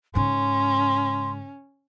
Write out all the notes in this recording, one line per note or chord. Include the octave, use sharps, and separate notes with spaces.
G#2 C#3 C#4 C6